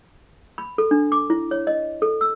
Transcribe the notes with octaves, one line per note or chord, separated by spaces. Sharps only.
B5
A4
D4
D6
E4
C#5
D#5
A4
E6